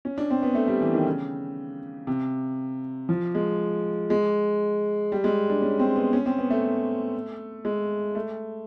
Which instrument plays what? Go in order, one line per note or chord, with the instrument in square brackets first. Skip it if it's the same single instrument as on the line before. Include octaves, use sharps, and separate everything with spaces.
[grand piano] C#4
D4
C4
B3
A3
G3
E3
D#3
C#3
C3
F3
G#3
G#3
G3
G#3
D4
C#4
C4
B3
C#4
C4
B3
A3
G#3
A3